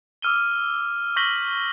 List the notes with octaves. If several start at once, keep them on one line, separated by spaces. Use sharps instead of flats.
D6 E6 F6 D#7 G7
C#6 G6 A#6 B6 F#7 G7